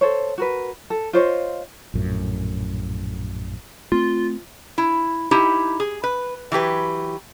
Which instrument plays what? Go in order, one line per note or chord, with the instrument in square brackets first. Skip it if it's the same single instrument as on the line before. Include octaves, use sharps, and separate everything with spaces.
[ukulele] A4 C5 C#5
F#4 A#4 B4
A4
F4 C5 C#5 D#5
[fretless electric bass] A#1 F#2 A2
[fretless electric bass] A3 C4 [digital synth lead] F4
[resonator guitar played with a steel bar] E4
D#4 E4 G4
G#4
B4
E3 F#3 G4 B4